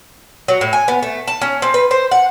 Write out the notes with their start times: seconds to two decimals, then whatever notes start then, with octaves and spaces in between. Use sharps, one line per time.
0.48 F#3
0.61 A2
0.73 G#5
0.88 B3
1.03 A3
1.28 A5
1.42 C#4
1.62 C4
1.74 B4
1.91 C5
2.12 F#5